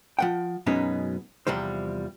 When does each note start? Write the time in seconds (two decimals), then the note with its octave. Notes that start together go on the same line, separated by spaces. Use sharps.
0.19 F3 F#5 G5
0.66 F#2 B2 G#3 B3 C#4 D#4
1.47 E2 C3 F3 G3 C5